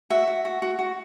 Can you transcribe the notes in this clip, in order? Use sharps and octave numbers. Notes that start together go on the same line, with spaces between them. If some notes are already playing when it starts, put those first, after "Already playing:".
F#4 E5
F#4
F#4
F#4
F#4